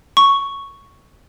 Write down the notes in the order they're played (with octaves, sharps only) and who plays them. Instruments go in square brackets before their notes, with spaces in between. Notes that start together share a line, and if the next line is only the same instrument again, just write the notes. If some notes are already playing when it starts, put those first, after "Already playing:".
[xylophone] C#6